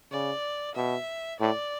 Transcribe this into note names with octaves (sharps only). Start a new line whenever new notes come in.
C#3 D5
B2 E5
A2 D5